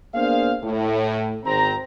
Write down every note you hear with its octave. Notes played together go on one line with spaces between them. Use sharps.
A#3 B3 D4 G#4 C5 F5
A2
G#1 C4 A#5